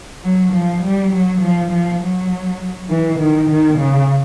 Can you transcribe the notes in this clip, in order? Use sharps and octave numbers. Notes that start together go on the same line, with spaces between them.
F#3
F3
G3
F#3
F3
F3
F#3
E3
D#3
D#3
C#3